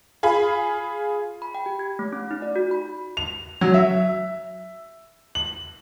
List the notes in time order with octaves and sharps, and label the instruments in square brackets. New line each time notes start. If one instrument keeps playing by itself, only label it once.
[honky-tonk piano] F4 G#4 B5
[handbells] B5
G5
G4
G#6
A3
C#4
D#4
D5
F#4
B5
[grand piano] F7
F#3
E5
F#7